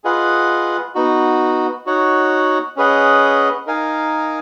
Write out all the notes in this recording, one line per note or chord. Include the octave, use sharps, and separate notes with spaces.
F4 G#4 B4 D#5 F#5
B3 D#4 F#4
D#4 F#4 C#5 F#5
C#4 G#4 B4 D#5 F#5
D#4 A#4 F5 G#5